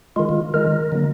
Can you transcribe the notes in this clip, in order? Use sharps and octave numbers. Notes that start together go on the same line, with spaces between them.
D#3 G#3 F4
F4
D#3 G#3 A#4
D3 F#3 A#3